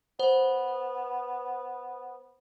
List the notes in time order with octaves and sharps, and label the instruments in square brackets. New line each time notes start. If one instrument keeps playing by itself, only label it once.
[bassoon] B3 [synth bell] C5